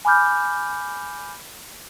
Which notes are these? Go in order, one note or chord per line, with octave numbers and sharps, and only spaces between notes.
G#5 B5 D6 F6 G6